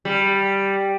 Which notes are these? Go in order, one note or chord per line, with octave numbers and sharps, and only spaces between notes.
G3